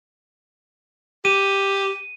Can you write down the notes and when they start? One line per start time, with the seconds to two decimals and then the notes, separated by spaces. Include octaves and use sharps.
1.25 G4 D#7